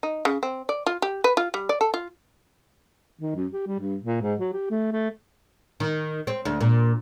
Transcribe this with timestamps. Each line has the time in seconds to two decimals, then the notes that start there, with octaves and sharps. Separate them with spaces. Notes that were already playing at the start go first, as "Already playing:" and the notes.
0.03 D#4
0.25 C#3
0.43 C4
0.69 D5
0.86 F4
1.02 G4
1.24 B4
1.37 F4
1.54 G3
1.69 D5
1.81 A4
1.94 F4
3.21 D#3
3.35 F#2
3.53 G4
3.67 G3
3.80 G2
4.03 A#2
4.22 G#2
4.40 F#3
4.53 G4
4.70 A3
4.92 A3
5.80 D#3
6.27 C4
6.45 D2
6.61 A#2